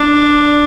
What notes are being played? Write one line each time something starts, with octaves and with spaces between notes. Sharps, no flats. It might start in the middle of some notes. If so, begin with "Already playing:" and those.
Already playing: D4
D5